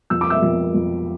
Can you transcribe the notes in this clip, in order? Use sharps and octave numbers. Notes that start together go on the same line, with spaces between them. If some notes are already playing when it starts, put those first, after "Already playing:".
F2 E6
D6
E5 E6
F2
F2